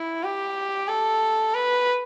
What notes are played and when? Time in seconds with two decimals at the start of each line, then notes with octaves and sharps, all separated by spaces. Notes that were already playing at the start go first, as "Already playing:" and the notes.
Already playing: E4
0.23 G4
0.88 A4
1.54 B4